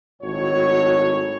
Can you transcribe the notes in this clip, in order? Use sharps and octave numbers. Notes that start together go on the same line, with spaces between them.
G#1 A2 F#3 C#5